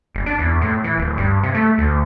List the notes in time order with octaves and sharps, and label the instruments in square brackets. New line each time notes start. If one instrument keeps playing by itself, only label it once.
[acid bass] F#1
D4
E2
A2
E3
D1
G2
C3
A3
D2